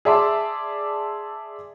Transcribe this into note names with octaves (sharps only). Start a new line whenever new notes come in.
G#4 D5 E5 A5 C6 D6